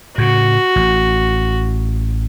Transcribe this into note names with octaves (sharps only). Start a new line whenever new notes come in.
A2 C#3 F#4
A1